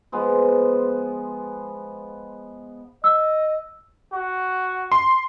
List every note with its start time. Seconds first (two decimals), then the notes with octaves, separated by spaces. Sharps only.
0.12 F3 G#3 B3
3.04 D#5 E6
4.13 F#4
4.92 C6